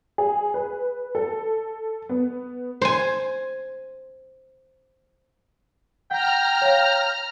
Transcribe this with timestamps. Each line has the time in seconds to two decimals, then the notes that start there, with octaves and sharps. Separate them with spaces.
0.18 G#4
0.54 B4
1.15 A4
2.09 B3
2.82 C5 G#5
6.11 F#5 G5 A#5 F6
6.62 C#5 F5